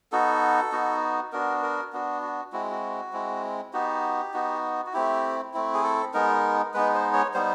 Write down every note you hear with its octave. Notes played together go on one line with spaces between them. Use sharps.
B3 D#4 F#4 A4
B3 D#4 F#4
B3 D4 F#4 A#4
A#4
B3 D4 F#4
F#4
G#3 C4 E4 F#4
F#4
G#3 C4 E4
B3 D#4 F#4 G4
B3 D#4 F#4
F#4
A3 C4 E4 G4
A3 C4 E4
G#4
A4
G#3 B3 D#4 A#4
G#3 B3 D#4 B4
C5
C#5
G3 B3 D#4 C5